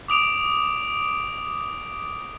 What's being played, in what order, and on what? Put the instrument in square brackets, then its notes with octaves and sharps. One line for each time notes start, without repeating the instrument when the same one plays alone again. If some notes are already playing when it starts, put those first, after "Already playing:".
[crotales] D6 D#6 D7 F7